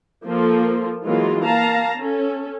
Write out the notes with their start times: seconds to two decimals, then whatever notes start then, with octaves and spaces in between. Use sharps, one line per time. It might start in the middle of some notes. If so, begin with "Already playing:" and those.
0.25 F3 A#3 F4 A4
1.05 E3 F#3 G#3 A#3 F4
1.44 A#3 F5 A5 A#5
1.97 C#4 A4